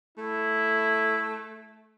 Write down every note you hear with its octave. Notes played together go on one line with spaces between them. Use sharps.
A3 E4